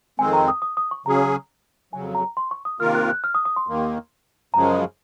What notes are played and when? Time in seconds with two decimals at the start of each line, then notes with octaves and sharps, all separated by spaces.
0.19 F2 D#3 G#3 C4 G#5
0.33 A#5
0.48 D#6
0.62 D#6
0.77 D#6
0.91 C#6
1.06 C#3 F#3 C#4 G#4 A#5
1.93 F2 C#3 F#3 G#5
2.15 A#5
2.37 C6
2.51 C#6
2.65 D#6
2.80 C3 D#3 A#3 F4 A#4 F6
2.95 F#6
3.09 F#6
3.24 F6
3.35 D#6
3.45 D#6
3.56 C6
3.67 D#2 D#3 A#3
4.54 F#2 C#3 F3 G#3 A#5